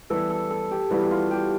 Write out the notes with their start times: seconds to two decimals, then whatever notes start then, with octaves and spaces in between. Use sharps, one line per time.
0.10 E3 G3 B3 E4 A4
0.30 A4
0.50 A4
0.71 G4
0.90 E3 G3 B3 E4 F#4
1.11 F4
1.31 G4